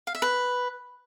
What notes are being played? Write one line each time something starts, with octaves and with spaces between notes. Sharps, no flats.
F5
E5
B4